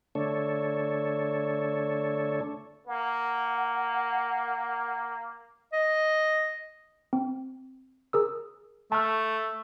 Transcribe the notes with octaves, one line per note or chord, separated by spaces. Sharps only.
D3 A3 D4 A4 C#5
A#3 F#5
D#5
C4
G#4 A#4 E6
A3 A5 F6